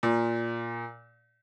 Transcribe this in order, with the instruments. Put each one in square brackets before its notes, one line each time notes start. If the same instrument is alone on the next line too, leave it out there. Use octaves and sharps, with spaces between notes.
[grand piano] A#2